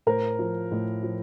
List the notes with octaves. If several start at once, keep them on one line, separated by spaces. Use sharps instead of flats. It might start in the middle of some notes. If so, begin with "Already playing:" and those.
A2 A#4 C5
F3
A2
F3